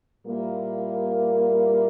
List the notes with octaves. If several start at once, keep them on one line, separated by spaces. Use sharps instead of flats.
A#2 G3 A#3 E4